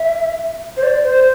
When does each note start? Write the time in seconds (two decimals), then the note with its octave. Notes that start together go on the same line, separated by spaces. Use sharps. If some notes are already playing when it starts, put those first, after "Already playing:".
Already playing: E5
0.77 C5
0.83 D5
1.04 C5